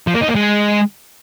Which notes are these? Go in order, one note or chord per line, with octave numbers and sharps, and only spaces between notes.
F3
A#3
D#4
A#3
G#3